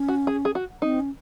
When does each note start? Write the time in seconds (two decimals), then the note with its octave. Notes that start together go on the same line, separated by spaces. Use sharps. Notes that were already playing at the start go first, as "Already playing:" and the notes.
Already playing: C#4
0.08 F#4
0.27 G#4
0.45 G#4
0.55 F#4
0.82 C4 D#4
1.00 C#4